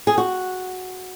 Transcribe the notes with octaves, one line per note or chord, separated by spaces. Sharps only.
G#4
F#4